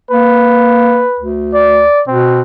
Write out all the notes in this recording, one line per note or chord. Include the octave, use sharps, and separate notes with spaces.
A#3 B4
D2
D5
B2 C4